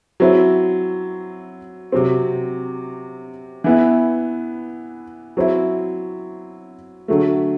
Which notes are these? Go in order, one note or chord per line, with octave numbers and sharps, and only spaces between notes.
F#3 C4 E4
C3 F#3 C4
E3 B3 E4
F#3 C4 E4
D3 F#3 A3